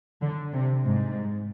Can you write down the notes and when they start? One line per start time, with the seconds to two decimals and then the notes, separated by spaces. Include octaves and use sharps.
0.21 D3
0.53 C3
0.85 G#2